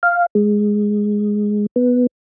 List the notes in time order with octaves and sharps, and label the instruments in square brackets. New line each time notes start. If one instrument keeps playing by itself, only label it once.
[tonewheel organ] F5
G#3
B3